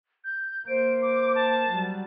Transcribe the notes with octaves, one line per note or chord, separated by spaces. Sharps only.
G6
A#3 C5 D7
D6
A5
F#3 G3